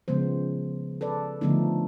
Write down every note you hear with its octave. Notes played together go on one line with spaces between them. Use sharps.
C#3 F3 G#3 B3 C5
A4 B4 D5
D3 F3 A3 B3 D4 D#4